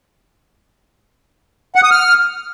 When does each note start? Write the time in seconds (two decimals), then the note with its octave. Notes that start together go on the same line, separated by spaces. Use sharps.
1.76 F#5
1.83 D#6
1.91 F6